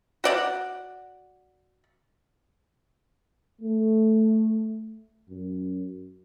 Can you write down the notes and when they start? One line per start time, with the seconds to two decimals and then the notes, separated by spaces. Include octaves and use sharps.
0.24 F#4 D5 F#5
3.61 A3
5.29 F#2